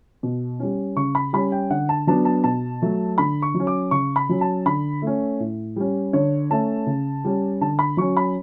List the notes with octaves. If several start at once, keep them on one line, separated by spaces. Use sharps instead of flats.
B2
G3 C#4
C#3 C#6
B5
G3 C#4 B5
G5
D3 F#5
A5
F#3 B3 D4 A5
A5
B2 A5
F#3 A3
D3 B5
C#6
F#3
C#4
D6
C#3 C#6
B5
F#3 C#4
A5
D3 B5
A3 C#4
A2
G3 C#4
D3 C#5
A3 C#4 A5
C#3
G3 C#4
D3 A5
B5
F#3 C#4 C#6
B5